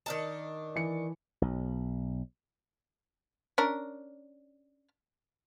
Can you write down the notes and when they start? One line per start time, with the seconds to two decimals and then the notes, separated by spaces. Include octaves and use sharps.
0.06 D#3 D4 D#5 A5
0.76 E3 C#7
1.42 B1
3.58 C#4 D4 A#4